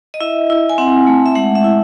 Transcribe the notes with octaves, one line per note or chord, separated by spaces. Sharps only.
D#5
E4 E5
E4
G#5
C4 F#5
A3
E5
G#3 F#5
E5
E4